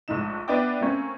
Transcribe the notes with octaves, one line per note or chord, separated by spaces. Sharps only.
A#1 G#3 A3 D#4 E7
B3 D4 D5 E5 G5 D6
A3 A#3 C4 C#4